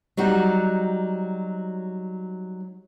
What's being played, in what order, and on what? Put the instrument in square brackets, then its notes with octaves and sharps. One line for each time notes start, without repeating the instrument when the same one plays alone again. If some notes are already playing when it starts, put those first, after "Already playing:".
[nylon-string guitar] F#3 G3 D#4 F#4